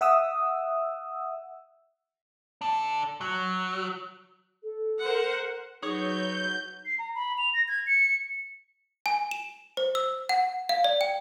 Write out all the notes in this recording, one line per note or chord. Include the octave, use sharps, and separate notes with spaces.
E5 F#5 D#6 E6
D4 A4
F#3
A4
A#4 C5 F#5
F#3 D#4 G#4 B4 C#5 G6
C7
A#5
B5
F7
A#6
G#6
C#7
G#5
E7
C5
E6
F#5
F5
D5
G5